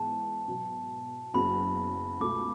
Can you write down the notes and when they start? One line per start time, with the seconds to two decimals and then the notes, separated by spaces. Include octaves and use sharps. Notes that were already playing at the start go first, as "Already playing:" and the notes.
Already playing: G#2 E3 B3 A5
0.48 B2 F#3 B3
1.34 F#1 F#2 C#3 F#3 B3 B5
2.20 C#2 B2 A3 D6